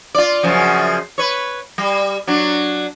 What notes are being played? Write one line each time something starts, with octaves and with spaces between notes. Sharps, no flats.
F4 D5
F#2 C#3 F3
B4 C#5
G3
F#3 D4